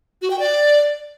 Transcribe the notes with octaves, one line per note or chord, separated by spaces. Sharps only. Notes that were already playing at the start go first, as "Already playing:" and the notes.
F#4
G5
D5